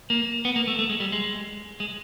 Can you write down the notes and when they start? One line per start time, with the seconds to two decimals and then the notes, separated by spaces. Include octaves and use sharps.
0.10 A#3
0.45 B3
0.56 A#3
0.67 A3
0.79 A3
0.89 G#3
1.00 G3
1.12 G#3
1.80 G#3